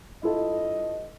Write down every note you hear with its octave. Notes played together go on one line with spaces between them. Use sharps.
G2 E4 F4 A4 D#5